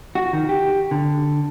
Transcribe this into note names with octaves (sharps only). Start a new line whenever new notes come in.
F#4
D#3
G4
D3